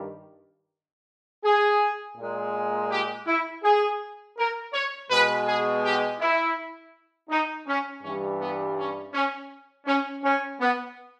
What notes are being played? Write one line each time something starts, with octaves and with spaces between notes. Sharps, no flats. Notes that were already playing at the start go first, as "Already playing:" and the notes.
Already playing: G2 D#3 G3
G#4
A#2 G#3
G4
E4
G#4
A#4
C#5
B2 G#3 B4
G#4
G4
E4
D#4
C#4
G2 E3 G3 C#4
B3
C#4
C#4
C#4
C#4
B3